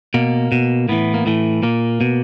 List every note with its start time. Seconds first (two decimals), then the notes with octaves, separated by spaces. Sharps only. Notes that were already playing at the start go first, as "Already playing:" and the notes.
0.14 B2 A#3
0.52 B2
0.89 A2 E3 B3
1.14 A#3
1.26 A2 E3 A3
1.63 A#2 A#3
2.01 B2